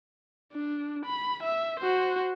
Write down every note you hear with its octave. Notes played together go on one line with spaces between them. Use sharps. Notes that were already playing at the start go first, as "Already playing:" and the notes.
D4
B5
E5
F#4 C5